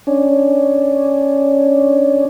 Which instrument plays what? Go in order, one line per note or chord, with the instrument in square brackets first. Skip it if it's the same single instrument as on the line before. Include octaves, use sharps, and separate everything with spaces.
[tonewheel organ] C#4 D4